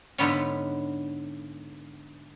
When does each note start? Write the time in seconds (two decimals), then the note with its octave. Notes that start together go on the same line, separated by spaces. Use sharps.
0.18 G#2 D3 B3 C#4